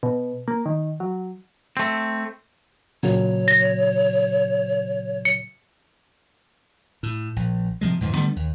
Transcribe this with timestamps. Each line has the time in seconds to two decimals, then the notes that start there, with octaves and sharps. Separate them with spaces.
0.03 B2
0.48 A#3
0.66 D#3
1.00 F#3
1.77 A3 C4
3.03 A#2 C#3 F#3 C#5
3.48 A#6
5.25 C#7
7.03 A2
7.36 A#1
7.81 C3 F3 G#3
8.00 E2 G#2 D#3 F3
8.14 D3 G3 A3 B3
8.36 D#2